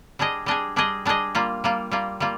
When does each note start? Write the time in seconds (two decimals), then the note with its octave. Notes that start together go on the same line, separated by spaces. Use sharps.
0.19 G3 D4 G#4 D#5
0.46 G3 D4 G#4 D#5
0.76 G3 D4 G#4 D#5
1.05 G3 D4 G#4 D#5
1.35 G3 A#3 F4
1.64 G3 A#3 F4
1.91 G3 A#3 F4
2.20 G3 A#3 F4